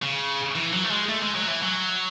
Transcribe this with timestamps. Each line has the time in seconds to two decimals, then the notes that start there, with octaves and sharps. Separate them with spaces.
0.03 C#3
0.56 E3
0.73 F#3
0.84 A3
0.91 G#3
1.09 A3
1.23 G#3
1.36 F#3
1.48 E3
1.63 F#3